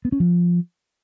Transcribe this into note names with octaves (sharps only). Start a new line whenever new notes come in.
B3
C#4
F3